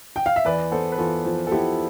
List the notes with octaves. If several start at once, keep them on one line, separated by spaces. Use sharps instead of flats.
G5
F5
E5
E2 B4 D5
B3 A4 C5
B4
E2 F4 A4
F3
A4
B3 E4 G4